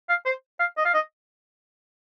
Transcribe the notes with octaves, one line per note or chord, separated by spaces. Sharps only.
F5
C5
F5
D#5
F5
D#5